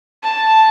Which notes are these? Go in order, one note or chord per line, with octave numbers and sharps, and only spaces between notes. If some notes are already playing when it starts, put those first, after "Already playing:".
A5